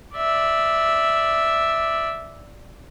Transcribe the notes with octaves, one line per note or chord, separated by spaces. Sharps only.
D5 E5